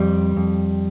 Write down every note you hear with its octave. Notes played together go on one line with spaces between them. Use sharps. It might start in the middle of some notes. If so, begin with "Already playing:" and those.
Already playing: F2 G3
F2